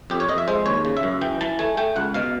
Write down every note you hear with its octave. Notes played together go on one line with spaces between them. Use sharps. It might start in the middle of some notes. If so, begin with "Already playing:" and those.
F2 G4
C#5
F2 D#5
E5
G#3 C5
D#2 C#5
C#3
E5
F#2
E3 G5
E3 A5
A3 G#5
A3 G5
C#2 F#5
B2 F5